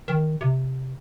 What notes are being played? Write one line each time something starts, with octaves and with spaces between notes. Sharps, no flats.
D#3
C3